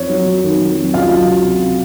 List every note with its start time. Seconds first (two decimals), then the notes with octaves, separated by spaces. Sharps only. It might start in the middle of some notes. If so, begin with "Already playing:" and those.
Already playing: F2 C#5
0.09 F#3
0.26 F2
0.44 D#3
0.60 F2
0.77 F#3
0.94 C#2 F4 F5
1.11 F#3
1.28 C#2
1.43 C3